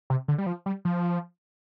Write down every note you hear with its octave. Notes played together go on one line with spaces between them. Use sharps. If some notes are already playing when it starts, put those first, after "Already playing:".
C3
D3
G3
F3
G3
F3